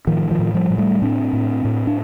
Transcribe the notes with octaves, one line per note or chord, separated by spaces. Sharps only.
A2 D#3 F3
D#3 F3
A2
F3 G3
A2
G3 A3
A2 C4 D4
A2
A2
D4